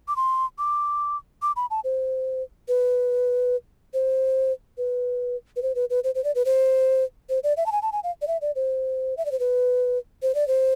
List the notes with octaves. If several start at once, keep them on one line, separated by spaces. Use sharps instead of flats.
D6
C6
D6
D6
B5
A5
C5
B4
C5
B4
B4
C5
B4
B4
C5
C5
D5
B4
C5
C5
D5
E5
A5
G#5
A5
G#5
F5
D5
E5
D5
C5
E5
D5
C5
B4
C5
D5
C5